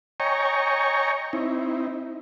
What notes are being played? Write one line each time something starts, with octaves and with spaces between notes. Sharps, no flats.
C#5 D#5 G5 G#5 A#5 C#6
C4 D#4 E4